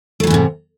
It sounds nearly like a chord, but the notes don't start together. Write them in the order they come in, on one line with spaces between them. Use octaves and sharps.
A3 F#3 E3 G#2 C3